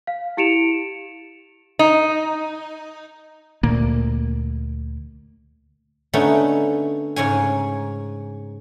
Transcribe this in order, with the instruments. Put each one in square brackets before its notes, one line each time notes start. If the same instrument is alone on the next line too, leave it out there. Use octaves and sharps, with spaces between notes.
[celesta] F5
E4 G4 C#7 D7 E7 F7
[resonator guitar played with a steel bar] D#4
[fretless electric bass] D2 A#2 A#3
[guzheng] D3 A3 B3 C#4 D#4
G#2 C#3 C#5 G#5